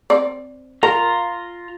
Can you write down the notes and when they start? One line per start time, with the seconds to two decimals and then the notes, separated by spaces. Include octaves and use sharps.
0.10 C4 D5
0.83 F4 A#4 A#5